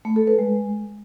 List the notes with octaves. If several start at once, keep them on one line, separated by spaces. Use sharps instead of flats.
A3
A4
B4
G#3